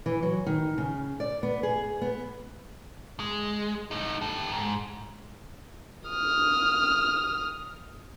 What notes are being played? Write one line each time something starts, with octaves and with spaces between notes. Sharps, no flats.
E3
F#3
D#3
C#3
D5
B3
G#4
B3
G#3
A2 D#4
G4 A4
G#2
D#6 F6